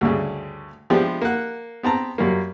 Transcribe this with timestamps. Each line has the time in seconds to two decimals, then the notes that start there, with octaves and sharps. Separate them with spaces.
0.01 D2 G2 C#3
0.90 C3 F3 G#3 B3 D4 G4
1.22 A#3 F#5
1.83 B3 C4 A5 A#5
2.18 F#2 G3 A#3